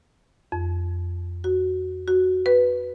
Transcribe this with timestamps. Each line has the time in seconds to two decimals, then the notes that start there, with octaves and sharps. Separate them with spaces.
0.52 F2
1.44 F#4
2.08 F#4
2.46 B4